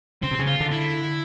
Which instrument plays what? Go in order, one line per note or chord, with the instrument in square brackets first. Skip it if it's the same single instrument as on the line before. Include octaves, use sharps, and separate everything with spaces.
[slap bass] C#3 [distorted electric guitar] C4
[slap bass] C3
C#3
[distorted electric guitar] F4
[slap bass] D3
[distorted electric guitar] E4